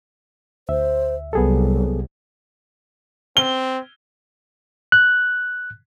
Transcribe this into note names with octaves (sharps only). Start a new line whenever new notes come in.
D2 C5 E5
C2 F#3 B3 G#4 A4
C4 G7
F#6